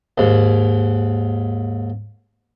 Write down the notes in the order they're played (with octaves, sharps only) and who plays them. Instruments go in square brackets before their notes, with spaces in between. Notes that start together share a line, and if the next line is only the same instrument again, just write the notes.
[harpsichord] D#2 G#2